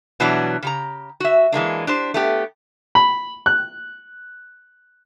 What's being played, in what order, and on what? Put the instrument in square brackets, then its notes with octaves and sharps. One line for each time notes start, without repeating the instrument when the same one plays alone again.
[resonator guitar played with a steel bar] B2 E3 F#3 G3 B3 D4
C#3 G4 A#5
F#4 E5
E3 G#3 A#3 D4
D4 G4 C5
A3 B3 G4
[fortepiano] B5
F#6